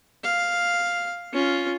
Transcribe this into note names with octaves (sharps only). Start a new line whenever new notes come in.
F5
C#4 F4